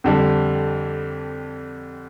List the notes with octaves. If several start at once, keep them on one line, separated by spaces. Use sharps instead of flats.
F2 D3 G3 D4